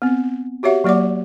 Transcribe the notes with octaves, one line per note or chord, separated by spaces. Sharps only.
B3 C4
F#4 G4 C#5 E5 F#5
F#3 A#3 D5 F#5 D6